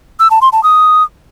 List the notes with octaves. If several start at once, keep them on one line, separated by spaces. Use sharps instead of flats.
E6
A5
C6
A5
D#6